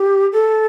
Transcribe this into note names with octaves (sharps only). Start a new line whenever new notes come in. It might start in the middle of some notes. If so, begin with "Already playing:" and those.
Already playing: G4
A4